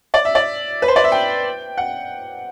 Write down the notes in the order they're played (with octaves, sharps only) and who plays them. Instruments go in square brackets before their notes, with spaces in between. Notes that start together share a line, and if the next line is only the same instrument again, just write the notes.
[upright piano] D5
E5
D5
B4
C5
D5
E5
G5
F#5